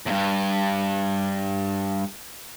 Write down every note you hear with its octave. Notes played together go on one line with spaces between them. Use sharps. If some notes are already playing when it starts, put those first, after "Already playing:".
E2 G2